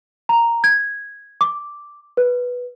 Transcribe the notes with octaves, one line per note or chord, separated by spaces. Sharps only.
A#5
G#6
D6
B4